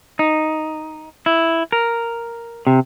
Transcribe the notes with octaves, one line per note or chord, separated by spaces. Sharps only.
D#4
E4
A#4
C3